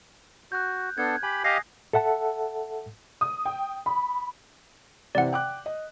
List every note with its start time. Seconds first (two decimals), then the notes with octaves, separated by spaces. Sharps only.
0.52 F#4 F#6 G6
0.98 B3 D4 A4 G#6
1.23 G4 G#5 B5
1.44 G4 D#5 F5 D#6 A#6 C7
1.93 A4 E5 F#5 A5
3.21 D#6
3.45 G5
3.86 B5
5.15 C3 E3 C4 D5 F#5
5.33 G5 D6 F#6
5.66 D#5